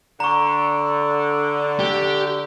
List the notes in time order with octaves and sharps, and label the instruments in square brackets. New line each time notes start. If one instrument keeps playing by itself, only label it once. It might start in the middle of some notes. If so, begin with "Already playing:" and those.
[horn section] D3 [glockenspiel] A#5 C#6
[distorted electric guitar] G4